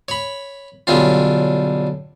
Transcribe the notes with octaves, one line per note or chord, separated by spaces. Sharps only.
C#5 B5
B1 D3 G3 C#4 F4